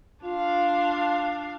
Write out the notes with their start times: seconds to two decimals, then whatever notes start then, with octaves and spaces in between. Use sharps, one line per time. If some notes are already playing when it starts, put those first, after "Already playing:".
0.25 D4 F4 F5